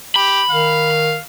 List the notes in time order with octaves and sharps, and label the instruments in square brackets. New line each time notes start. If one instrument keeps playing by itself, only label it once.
[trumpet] G4 [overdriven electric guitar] B5
[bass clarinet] D#3 [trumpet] F5